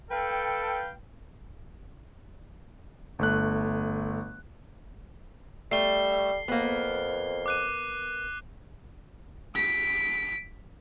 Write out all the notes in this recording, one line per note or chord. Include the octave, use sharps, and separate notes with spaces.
A4 B4 F5 G5
G1 A3 F#6
G3 A3 C7 G7
F2 A#3 B3
D6 F#6 D#7
B6 D7